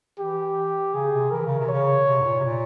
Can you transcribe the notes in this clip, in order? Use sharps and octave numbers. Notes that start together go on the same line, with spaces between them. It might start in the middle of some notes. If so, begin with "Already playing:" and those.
E3 G4
C#3 G#4
C3
E3 A#4
C#3
C3
C#3 C#5
C3
G#2
A#2
C3
A#2